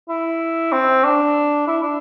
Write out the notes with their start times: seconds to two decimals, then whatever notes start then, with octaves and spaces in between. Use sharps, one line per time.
0.09 E4
0.72 C4
1.04 D4
1.67 E4
1.83 D4